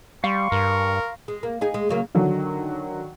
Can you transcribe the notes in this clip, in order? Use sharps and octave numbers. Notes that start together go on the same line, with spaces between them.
G3 F5 C6 C#6
G2 A#4
G#3
A#3
D#4 G#4
G#3
C#3 F#3 A#3
D3 D#3 F#3